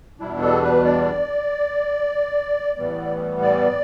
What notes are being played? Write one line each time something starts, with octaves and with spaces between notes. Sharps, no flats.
E2 B2 G3 D4 E4
A4
B4
D5
A2 E3 G3 B3
D5